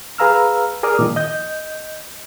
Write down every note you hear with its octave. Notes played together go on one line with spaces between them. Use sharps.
G#4 B4 F5 A#5 E6 F6
G#4 A#4 D5 D6 D#6 F6
A#2 D#3 F3
D#5 G6